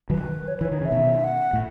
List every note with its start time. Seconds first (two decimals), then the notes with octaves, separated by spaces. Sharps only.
0.10 D#3 F#3 B4
0.48 C#5
0.56 B4
0.61 E3 C#5
0.71 D#3
0.81 C#3 E5
0.92 B2 D#3
1.24 F#5
1.53 A2